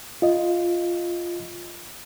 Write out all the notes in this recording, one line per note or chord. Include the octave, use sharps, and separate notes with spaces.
F4 D#5